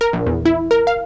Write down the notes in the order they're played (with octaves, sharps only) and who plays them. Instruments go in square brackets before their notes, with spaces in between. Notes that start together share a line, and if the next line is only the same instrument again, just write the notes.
[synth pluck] A#4
A#1
E2
E4
A#4
F5